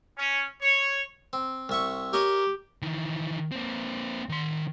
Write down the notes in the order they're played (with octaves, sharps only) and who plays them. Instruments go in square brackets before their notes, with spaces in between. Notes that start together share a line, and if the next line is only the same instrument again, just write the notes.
[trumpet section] C#4
C#5
[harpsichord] C4
C2 E5 C#6
[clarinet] G4 [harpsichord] A#4 C#5 D#5
[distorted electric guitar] D#3 E3
A#3 C4
D#3 C6